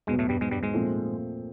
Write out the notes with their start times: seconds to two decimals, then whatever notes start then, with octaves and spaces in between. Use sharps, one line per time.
0.07 E2 G#2 B2 F#3 G#3 B3
0.19 A2 A3
0.29 G2 G3
0.41 G#2 G#3
0.51 G2 G3
0.63 G#2 G#3
0.74 A#2 F3 A3 C4